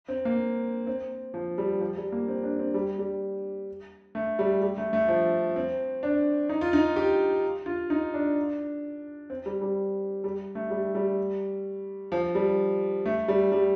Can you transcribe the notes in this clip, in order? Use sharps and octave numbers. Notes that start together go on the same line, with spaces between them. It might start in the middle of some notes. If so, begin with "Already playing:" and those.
C4
A#3
C4
F3
G3
F3
G3
A#3
C4
D4
C4
G3
G3
A3
G3
G3
A3
A3
F3
C4
D4
D#4
F4
D#4
G4
F4
D#4
D4
C4
G3
G3
G3
A3
G3
G3
F3
G3
A3
G3
G3